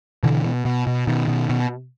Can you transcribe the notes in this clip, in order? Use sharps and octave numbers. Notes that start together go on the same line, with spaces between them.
B2 D3 E3
B2
B2
B2
B2 D#3
B2
B2